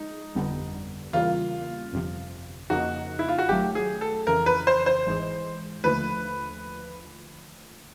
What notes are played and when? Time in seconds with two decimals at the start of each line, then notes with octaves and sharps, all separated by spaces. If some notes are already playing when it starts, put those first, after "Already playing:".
Already playing: F3 G#3 D#4
0.35 G1 F2 D3 G3 B3
1.13 E2 C#3 E3 G3 A#3 F4
1.93 G1 F2 C3 F3
2.70 F2 C#3 F3 A#3 D#4 F#4
3.19 E4
3.28 F4
3.38 F#4
3.49 G#1 F#2 D#3 F#3 A3 G4
3.75 G#4
4.01 A4
4.27 F2 C#3 E3 A#4
4.46 B4
4.67 C5
4.86 C5
5.06 G#1 G#2 E3 G#3
5.84 D#2 D3 F3 A3 B4